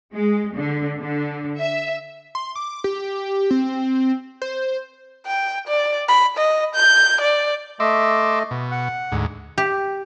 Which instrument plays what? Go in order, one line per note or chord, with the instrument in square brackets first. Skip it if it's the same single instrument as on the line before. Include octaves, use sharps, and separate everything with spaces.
[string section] G#3
D3
D3
E5
[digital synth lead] C6
D6
G4
C4
C5
[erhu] G5
D5
B5
D#5
G6
D5
[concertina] A3 D#5 [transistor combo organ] E5 C6 D6
[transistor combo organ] B2
[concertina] F#5
[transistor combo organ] D2 G#2
[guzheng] G4